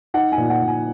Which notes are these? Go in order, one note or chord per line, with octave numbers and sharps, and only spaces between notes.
D#4 F#5
G#5
A#2
F#5
A#2
G#5